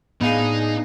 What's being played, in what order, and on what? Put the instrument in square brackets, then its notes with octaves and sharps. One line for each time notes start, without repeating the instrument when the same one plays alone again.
[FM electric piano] A2 F5 C7 [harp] B3 [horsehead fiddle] D4 G#4 [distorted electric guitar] D#4